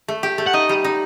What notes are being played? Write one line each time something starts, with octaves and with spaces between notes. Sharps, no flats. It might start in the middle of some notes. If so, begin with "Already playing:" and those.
A3
G4
A3
F#5
D#4 D#5
G3
D#4